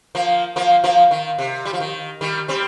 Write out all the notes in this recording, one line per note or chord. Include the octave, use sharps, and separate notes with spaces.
F3 A#3
F3 A#3
F3 A#3
D#3
C3
G3
F3
D#3
D#3 G3
G3 C4